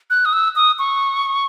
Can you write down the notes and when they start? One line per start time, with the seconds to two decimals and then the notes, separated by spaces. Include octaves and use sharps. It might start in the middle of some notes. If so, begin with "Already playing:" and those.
0.10 F#6
0.25 D#6
0.33 E6
0.56 D#6
0.79 C#6